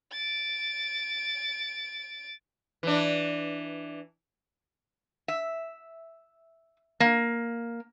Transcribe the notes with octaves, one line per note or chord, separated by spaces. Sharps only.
A6 D7
E3 D4
E5
A#3